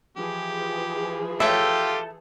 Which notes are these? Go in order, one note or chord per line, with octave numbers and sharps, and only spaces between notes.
E3 F3 G4 G#4
A3 F4 G4 A4 C#5 E5 G5